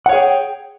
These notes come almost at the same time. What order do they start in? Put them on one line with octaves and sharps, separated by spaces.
F#5 C#5 G#4 G5